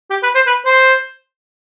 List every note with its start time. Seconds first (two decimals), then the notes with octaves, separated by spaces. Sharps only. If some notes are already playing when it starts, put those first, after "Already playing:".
0.11 G4
0.23 B4
0.35 C5
0.47 B4
0.66 C5